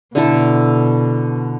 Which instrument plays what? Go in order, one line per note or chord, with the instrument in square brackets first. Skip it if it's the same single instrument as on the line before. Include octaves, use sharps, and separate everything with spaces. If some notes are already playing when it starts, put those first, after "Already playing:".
[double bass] B2 [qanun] D3 E4 A4